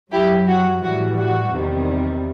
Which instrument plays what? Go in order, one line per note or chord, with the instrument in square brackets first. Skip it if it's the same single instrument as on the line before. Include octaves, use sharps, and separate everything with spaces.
[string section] F#2 F#3 E4 G4
F#4
A2 E3 G3 F#4
F#4
E2 C3 D#3 G3